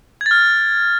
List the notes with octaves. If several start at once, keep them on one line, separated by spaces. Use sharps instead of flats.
G#6
A6
F6